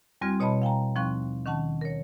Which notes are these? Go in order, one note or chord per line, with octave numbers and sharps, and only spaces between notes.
E2 G3 C4 F#4 F6 G#6
B2 C#5 D#5 A5 B5
F5 G5 G#5 A#5
D#2 F3 C4 F5 C#6 F#6
D#3 C#4 F#5 A5
A#4 C#5